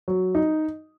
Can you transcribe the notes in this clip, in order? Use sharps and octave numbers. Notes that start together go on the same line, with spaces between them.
F#3
D#4